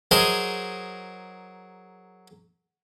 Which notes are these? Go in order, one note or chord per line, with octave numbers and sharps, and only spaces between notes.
F#3 G#4 A#4 C5 D#5